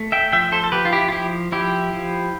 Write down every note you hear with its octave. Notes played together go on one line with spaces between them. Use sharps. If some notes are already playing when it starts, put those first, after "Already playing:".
Already playing: A3
E5 G5
F3 E5 G5
A4 C5
A4
F3 G4 B4
F4
E4 G4
F4
F3 E4 G4
F3 E4 G4
F3